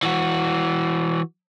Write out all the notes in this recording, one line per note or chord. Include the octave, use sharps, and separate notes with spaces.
E3 F#4